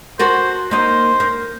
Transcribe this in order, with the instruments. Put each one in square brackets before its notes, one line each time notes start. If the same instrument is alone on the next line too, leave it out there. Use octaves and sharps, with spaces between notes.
[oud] F#4 A4 A#4 [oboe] C5
[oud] A#3 D#4 [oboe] C5
[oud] A#4